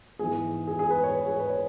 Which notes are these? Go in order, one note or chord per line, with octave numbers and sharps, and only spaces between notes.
G#2 E3 G#3 B3 G#4
G#4
G#4
B4
C#5
B4
G#4
C#5
B4
C#5